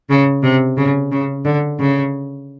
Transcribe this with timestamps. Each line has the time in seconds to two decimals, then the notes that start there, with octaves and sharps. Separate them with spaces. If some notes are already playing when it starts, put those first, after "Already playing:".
0.10 C#3
0.43 C3
0.77 C#3
1.12 C#3
1.45 D3
1.80 C#3